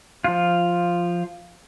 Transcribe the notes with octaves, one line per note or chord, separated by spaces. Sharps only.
F3 F4